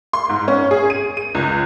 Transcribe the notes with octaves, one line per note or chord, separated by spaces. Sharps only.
C6
G#2
C#4
G#4
D#7
D#7
C#2